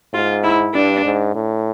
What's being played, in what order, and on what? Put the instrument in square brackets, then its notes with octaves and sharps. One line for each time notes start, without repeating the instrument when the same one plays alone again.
[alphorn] G#2 [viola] F4
[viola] E4
[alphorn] G2 [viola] D4
[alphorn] G#2
A2